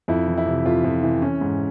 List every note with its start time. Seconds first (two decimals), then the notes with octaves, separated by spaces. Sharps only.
0.08 F2 E4
0.27 E3
0.37 E4
0.46 C3
0.65 F2 F4
0.84 F2
1.04 E3
1.22 E3 C#4
1.41 G#2